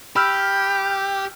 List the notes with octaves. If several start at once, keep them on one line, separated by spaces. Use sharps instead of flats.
G4 B5 E6 F6 G6